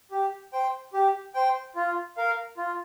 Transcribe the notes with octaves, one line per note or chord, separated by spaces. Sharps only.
G4
C5 G5
G4
C5 G5
F4
A#4 F5
F4